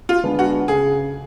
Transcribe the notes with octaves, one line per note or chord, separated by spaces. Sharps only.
F4
D3 G#3 B3 D4
F#4
C#3 G#4